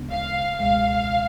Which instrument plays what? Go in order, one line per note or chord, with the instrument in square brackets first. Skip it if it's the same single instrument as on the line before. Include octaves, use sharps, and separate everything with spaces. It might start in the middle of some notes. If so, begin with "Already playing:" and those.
Already playing: [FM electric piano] D2 C#3 G#3 B3 D4
[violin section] F5
[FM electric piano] C#2 B2 G#3 [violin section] F5